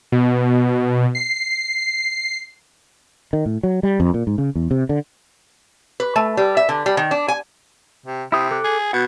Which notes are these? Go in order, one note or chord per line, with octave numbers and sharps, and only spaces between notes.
B2
C7
D#3
A2
F#3
G3
F2
A#2
G#2
C#3
E2
C3
D3
B4
A3
G3
E5
D3
G3
D#3
D4
G#5
C3
C3 E4 D#6
A4 D6 F#6
G#4
B2 F#5